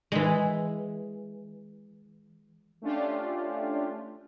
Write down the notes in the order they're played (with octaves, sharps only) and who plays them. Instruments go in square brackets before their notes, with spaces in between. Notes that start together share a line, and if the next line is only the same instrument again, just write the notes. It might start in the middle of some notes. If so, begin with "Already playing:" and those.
[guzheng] E3 G#3
[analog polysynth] A3 C#4 D4 F4 G4